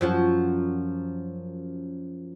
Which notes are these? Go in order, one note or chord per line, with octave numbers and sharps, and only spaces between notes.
F#2 F3 F#4